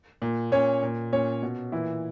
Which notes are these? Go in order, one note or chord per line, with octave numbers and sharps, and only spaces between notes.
A#2
A#2 C#4 C#5
A#2
A#2 C#4 C#5
B2
A#2 E3 E4